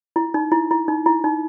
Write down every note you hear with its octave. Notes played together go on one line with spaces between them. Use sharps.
E4
D#4
E4
E4
D#4
E4
D#4